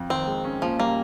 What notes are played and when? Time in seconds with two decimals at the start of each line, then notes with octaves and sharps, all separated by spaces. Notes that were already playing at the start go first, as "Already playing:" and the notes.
Already playing: F2
0.10 D#3 C4
0.27 G#3
0.44 C#4
0.62 A#2 F3
0.79 G3 A#3